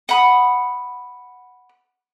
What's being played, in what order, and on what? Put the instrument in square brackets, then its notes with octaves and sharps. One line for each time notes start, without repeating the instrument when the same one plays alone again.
[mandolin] F#5 B5 D#6